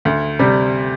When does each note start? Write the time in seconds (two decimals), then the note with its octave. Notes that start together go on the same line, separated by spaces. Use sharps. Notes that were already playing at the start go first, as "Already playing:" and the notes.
0.05 D2
0.39 C3 G3